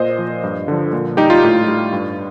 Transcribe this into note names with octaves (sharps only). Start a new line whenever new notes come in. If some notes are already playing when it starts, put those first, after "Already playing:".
Already playing: A#2 C5 D#5
F3
G2
D3 F3
A#2
G3 D#4 G4
F4
A2
G3
G2